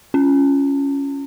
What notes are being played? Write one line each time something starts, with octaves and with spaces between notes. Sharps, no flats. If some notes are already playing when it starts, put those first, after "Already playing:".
C#4